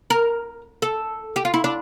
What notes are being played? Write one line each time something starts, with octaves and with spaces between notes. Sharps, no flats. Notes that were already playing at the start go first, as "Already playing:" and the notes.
A#4
A4
G4
F4
E4
D4